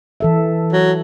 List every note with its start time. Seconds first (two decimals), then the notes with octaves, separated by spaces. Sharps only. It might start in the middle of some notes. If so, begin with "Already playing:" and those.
0.20 E3 A4 E5
0.73 F#3